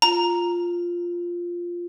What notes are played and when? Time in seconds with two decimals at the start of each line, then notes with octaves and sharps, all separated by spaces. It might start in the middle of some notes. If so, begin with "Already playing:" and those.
0.02 F4 A#5